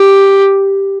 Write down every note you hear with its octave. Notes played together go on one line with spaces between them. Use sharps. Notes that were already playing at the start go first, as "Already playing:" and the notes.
Already playing: G4